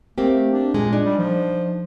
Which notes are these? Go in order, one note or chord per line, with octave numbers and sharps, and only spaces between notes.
A3 A#3 C4 G4
D4
A#2 G#3
D4 D#4
G3
F3